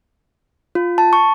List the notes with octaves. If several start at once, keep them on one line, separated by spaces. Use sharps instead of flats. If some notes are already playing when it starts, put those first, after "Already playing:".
F4
A5
C#6